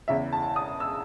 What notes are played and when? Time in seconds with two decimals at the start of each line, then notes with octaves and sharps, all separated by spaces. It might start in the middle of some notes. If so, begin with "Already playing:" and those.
0.08 E2 C#3 E3 E5
0.32 A5
0.56 D#6
0.80 E6